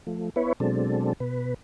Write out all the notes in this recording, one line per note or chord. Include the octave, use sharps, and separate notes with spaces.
F3 A3
B3 E4 B4 C#5
B2 F#3 G#3 C4 D4 A4
B2 B4